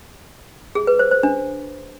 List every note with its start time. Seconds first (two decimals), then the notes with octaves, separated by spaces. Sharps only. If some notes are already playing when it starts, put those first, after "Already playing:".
0.75 G#4
0.87 B4
0.99 C5
1.11 C5
1.23 D4